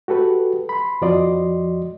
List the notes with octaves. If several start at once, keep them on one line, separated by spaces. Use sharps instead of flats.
F#4 G4 A4 B4
B5 C6
F2 F3 F#4 D5 D#5 C6